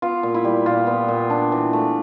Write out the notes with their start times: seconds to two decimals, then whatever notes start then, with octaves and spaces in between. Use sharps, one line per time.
0.02 B3 F4
0.23 A#2
0.34 E4
0.45 G3
0.66 A#2 F4
0.87 B3
1.08 A#2
1.30 D4
1.52 E3
1.73 A3